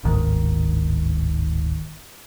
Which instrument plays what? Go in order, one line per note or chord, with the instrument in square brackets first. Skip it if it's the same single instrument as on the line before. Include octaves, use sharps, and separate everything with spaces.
[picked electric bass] D1 G1 G#2 D#3